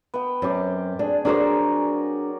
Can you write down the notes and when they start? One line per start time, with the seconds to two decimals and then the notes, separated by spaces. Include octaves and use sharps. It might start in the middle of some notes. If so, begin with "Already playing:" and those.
0.14 B3 G5
0.42 F#2 C4 G4
0.99 D4 G#4
1.25 F#3 D4 G#4 A#4 C5 D5